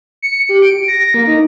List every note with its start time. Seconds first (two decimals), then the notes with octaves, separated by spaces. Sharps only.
0.22 C#7
0.49 G4
0.62 D7
0.88 A#6
1.14 A#3
1.27 D#4